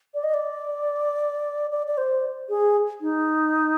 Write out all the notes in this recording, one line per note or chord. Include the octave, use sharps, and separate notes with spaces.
D5
D#5
D5
D5
D5
C5
G#4
D#4